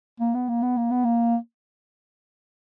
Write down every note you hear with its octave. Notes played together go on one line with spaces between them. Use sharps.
A#3
B3
A#3
B3
A#3
B3
A#3